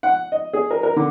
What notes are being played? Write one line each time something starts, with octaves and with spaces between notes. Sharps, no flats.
F#5
D#5
G#4
A#4
A#4
D3